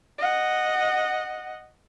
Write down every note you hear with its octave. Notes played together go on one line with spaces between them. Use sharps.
D#5 F#5